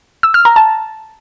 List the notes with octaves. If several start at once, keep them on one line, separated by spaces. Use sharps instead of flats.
E6
F6
A#5
A5